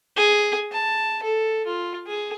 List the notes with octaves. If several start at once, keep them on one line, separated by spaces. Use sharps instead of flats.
G#4
A5
A4
F4
G#4